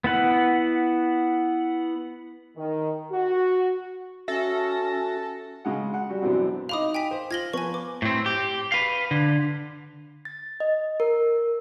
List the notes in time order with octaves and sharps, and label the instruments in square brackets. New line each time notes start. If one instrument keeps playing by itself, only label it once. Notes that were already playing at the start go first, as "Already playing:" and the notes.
[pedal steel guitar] B3 E4 F#5
[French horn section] D#3
F#4
[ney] C#4 [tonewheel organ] F#4 A#6 [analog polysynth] A4 [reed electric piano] E5
[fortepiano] C#3 G#3 F#5
F#5
G3 F#4
F#2 B2 E3 C4 D4
[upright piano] D#4 D6 F7 [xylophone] F5 B5 D#6
[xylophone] G5 G#5 B6
[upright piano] C5
[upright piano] F4 F#7 [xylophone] G#6 A#6 G7
[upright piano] F3 B3 [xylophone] G#5 C#6
[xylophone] D6
[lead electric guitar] A2 C4
G4
B4 F5
D3
[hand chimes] A6
D#5
A#4